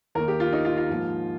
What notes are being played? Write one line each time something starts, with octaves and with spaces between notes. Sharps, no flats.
D#2 D#3 A#3 A#4
G4
F4
D#4
F4
F4
G#2 F3 A#3